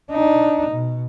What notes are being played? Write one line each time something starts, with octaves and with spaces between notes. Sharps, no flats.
D4 D#4
B2